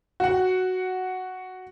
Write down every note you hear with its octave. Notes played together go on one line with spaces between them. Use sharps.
F#4 F#5